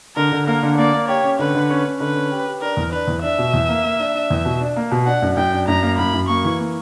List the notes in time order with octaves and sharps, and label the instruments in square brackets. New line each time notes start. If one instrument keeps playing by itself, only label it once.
[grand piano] D3 [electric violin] A#4
[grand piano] D3
[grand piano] A#3 [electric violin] A#4
[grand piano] D3
[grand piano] A#3 [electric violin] D5
[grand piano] A#3
[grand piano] G4 [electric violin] C#5
[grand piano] C#4
[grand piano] D3 [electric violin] B4
[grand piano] D3
C#4
C#4
[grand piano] D3 [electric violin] B4
[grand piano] C#4
G4
G4
[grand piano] D4 [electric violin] A#4
[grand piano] E2
[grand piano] D4 [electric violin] B4
[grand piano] E2
[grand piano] D4 [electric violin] E5
[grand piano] B2
E2
A#3
A#3
D4
D4
E2
B2
D4
A#3
B2
[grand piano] D4 [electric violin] F#5
[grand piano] F#2
[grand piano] F#2 [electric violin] G5
[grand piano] D4
[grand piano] F#2 [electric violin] A#5
[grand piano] A#3
[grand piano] F#2 [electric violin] B5
[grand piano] F#2
[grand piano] A#3 [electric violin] C#6
[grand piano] E3
A#3